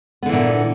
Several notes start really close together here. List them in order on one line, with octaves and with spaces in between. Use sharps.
B3 D3 E3 A#2